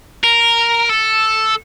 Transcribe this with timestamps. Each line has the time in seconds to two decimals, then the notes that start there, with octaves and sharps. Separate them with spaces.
0.24 A#4
0.90 A4